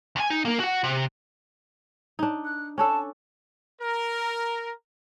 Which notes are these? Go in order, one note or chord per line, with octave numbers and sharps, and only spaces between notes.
D2 G#5
D#4
A#3 A#4
F#4 F#5
C3
D4 D#4
F#6
C#4 D4 A4 A5
A#4